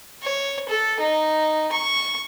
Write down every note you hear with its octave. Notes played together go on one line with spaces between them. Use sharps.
C#5
A4
D#4
C#6